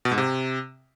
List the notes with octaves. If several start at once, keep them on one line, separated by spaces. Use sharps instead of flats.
B2
G#2
C3